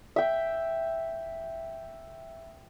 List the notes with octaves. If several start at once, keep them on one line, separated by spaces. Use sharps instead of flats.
E5 G5